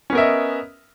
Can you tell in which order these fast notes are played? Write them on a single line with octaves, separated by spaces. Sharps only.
C#4 B3 A#4 E5 D#5